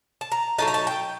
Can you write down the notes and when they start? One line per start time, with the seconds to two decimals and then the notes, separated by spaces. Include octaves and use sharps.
0.21 A5
0.32 A#5
0.59 F#3 A3 D#4 A5
0.68 A#5
0.74 A5
0.87 G5